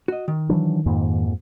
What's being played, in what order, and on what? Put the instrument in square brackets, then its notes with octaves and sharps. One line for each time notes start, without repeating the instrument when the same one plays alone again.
[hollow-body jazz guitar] F#4 D#5
D#3
[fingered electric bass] E3 F#3 D4
F2 G#2 A#3